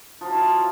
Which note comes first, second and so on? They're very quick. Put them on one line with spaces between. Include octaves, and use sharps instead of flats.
F3 F#3 E4 F4